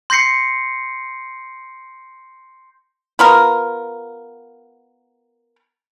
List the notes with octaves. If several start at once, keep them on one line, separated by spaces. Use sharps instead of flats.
C6 G6 A#6 C7 C#7
B3 F4 A#4